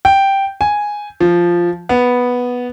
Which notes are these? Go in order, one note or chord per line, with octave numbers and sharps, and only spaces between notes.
G5
G#5
F3
B3